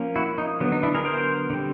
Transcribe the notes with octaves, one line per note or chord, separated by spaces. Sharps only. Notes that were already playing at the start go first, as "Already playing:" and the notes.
Already playing: F3 A#3 C#4
E4 F#4
D#4
D3 F#3 B3
D#4
D4 E4
G#4 A#4
A#4 C5
D3 G3 C4